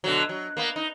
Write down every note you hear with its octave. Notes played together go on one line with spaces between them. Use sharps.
B2 D3 F#3
F#3
A#3 B3
D#4